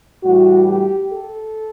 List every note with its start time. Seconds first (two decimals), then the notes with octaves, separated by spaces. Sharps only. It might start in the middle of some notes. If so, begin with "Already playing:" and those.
0.24 A2 E3 G3 F#4
0.68 G4
1.12 A4